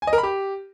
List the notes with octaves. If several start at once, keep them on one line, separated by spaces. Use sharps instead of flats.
G#5
D#5
A#4
B5
G4